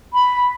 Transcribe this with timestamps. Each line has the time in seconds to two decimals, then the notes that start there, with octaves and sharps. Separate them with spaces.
0.13 B5